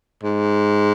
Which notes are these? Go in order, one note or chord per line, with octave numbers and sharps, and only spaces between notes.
G#2